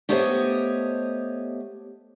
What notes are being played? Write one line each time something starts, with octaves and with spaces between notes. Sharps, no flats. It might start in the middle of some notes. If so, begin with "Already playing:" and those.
A3 B3 G4 C5 C#5 D#5